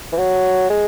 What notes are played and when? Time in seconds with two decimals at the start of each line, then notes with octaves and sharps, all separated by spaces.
0.12 E3
0.18 F#3
0.70 G#3